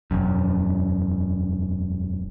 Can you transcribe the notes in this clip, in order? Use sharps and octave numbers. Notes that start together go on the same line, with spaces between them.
E1 F#2